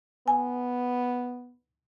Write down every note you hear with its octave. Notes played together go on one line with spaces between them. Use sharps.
B3 G#5